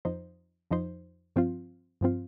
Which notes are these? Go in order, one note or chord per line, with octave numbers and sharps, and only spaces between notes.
F2 F3 D#4 C5
F2 F3 D#4 C5
G2 F3 C4 F4
G2 F3 C4 F4